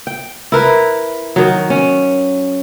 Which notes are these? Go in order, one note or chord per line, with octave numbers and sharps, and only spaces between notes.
G5
E4 A#4 B4
D#3 F#3
C#4